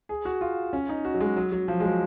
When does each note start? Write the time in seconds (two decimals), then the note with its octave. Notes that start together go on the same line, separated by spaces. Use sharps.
0.09 G#4
0.25 F#4
0.41 F4
0.73 C#4
0.89 D#4
1.05 F#4
1.14 F#3
1.20 G#3
1.36 F#3
1.52 F#3
1.68 F3
1.80 G#3
1.84 F#3